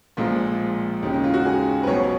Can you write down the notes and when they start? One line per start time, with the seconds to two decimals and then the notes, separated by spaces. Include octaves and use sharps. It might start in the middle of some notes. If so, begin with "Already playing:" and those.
0.17 A#1 A#2 F3 G#3 F4
1.02 D#2 C#3 G#3 D#4
1.14 D#4
1.24 F4
1.34 F#4
1.45 G#4
1.83 B4
1.87 B1 B2 F#3 C#5